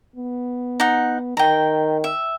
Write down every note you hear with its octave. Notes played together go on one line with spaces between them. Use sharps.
B3
D#4 F#5
D#3 G5 A#5
E5